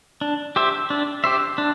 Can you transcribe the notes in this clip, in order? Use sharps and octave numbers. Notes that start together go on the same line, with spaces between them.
D4
G4 C5 E5
D4
G4 C5 E5
D4